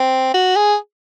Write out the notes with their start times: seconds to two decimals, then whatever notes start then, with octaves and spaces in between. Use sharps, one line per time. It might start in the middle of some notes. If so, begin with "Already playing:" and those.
Already playing: C4
0.34 F#4
0.56 G#4